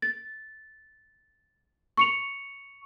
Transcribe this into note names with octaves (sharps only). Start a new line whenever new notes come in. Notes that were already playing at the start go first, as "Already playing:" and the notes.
A6
C#6 C#7 F7